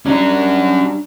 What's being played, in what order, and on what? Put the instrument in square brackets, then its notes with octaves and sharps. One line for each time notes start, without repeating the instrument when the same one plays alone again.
[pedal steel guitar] G3 D4 A#5 [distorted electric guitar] C#4 F#4